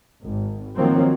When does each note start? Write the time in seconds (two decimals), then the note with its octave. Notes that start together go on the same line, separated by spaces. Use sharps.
0.24 G#1
0.76 D#3 F3 F#3 A#3 C4